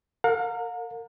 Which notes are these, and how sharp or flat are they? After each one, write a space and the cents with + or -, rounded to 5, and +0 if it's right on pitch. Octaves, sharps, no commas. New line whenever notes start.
A#4 -25 F5 +45